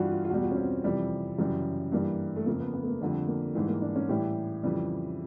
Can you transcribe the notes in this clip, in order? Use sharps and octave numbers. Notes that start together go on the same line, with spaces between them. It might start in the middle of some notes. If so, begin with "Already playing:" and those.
Already playing: G2 E3 G3 F4 F#4
F4
F4
E2 B2 G3 F#4
F4
C#4
C4
F2 C3 E3 G3
F#2 C#3 E3 G3
G2 E3 G3 A#3
A3
F2 C#3 F3 A#3
B3
B3
A3
A#3
F2 D3 G3 A3
A#3
G#2 E3 G3
A#3
D4
C#4
A2 E3 G3 G4
F2 C#3 E3 G3